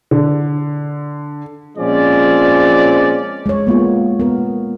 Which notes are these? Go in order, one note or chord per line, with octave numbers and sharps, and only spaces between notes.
D3
A#2 F3 G#3 C4 C#4 D5
G#3 C#5
A#3 B3 F4
B3 A#4